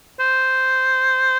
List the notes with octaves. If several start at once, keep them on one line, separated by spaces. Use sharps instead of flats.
C5